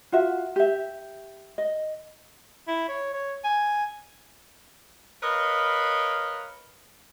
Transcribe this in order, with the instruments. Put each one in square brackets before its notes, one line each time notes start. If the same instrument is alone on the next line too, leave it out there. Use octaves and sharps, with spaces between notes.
[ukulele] F4 F#4 E5
G4 E5
D#5
[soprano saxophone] E4
C#5
C#5
G#5
[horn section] A#4 B4 C#5 D#5 F5 B5